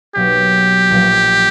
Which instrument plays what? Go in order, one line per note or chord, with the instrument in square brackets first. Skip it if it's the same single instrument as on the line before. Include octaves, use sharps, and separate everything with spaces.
[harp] B1 B2 F#3 A#3 [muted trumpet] G4
[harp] A#1 A#2 F#3 A#3